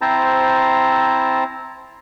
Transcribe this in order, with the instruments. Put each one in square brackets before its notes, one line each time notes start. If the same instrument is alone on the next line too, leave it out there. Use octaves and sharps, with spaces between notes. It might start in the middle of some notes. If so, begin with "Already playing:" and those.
[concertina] C4 E4 C5 A5 A#5